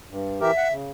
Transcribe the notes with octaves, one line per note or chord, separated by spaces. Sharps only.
G2
E3 G4 A#4 E5
F#5
C#3